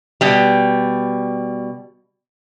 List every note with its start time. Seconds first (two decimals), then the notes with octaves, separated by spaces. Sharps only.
0.21 B2 G3